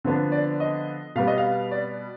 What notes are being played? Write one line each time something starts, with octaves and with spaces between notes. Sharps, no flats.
D3 F3 B3 D4
D5
D#5
B2 G3 B3 F5
D#5
F5
D5